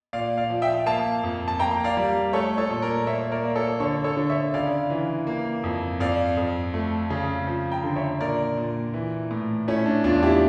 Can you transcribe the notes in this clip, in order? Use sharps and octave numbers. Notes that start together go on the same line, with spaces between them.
A#2 D5 F5
D5 F5
F3
E5 G5
A#3 F5 A5
F2
A5
A#3 G5 A#5
D5 F5
G3
A3 A4 C#5
A4 C#5
A#2
A#4 D5
A#3 C#5 E5
A#4 D5
A#3
A4 C#5
D3 A4 C#5
A4 C#5
D3
C#5 E5
C#3 D5 F5
E3
A#3
F2
F2 D5 F5
F2
A3
C#3
F3
G5 A#5
D3
C#5 E5
A#2 A#4 D5
A#2
E3
A2
A3 C#4 E4
D4
E2 D4 F4
E4 G4